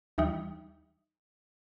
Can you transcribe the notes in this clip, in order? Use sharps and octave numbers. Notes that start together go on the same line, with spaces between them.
D#2 E3 G3 D#4